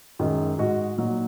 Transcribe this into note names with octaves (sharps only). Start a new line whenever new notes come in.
F#2 D#3 G#3
G#2 G#3 F#4 D#5
A#2 F#3 D#4